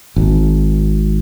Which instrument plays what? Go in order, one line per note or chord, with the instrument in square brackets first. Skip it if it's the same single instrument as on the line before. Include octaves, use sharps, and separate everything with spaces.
[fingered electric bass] G#1